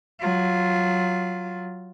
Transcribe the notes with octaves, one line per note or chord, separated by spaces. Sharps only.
F#3 F4